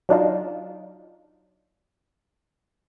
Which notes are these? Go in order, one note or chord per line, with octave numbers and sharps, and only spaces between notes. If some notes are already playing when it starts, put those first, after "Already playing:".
F#3 D4 D#4 F4